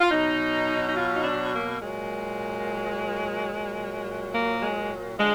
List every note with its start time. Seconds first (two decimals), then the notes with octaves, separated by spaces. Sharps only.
0.01 F4
0.11 B2 F#3 D#4
0.88 D#4
0.96 F4
1.15 D#4
1.23 D4
1.53 A#3
1.80 A#2 F#3 G#3
3.49 A#2 F#3
4.34 A#3
4.62 G#3
5.19 D3 F3 G#3